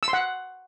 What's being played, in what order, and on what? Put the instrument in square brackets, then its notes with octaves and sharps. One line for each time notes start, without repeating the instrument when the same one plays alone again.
[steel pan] E6
C6
F#5